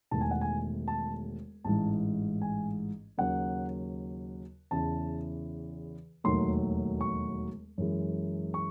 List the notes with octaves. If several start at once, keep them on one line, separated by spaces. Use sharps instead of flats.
E1 E2 D#3 A3 A5
G#5
F#5
G#5
A5
A1 G#2 E3 A5
G#5
D#2 C#3 F#3 F#5
E2 C#3 E3 A5
E1 D#2 D#3 F#3 A3 C6
C#6
F#2 E3 G#3
C#6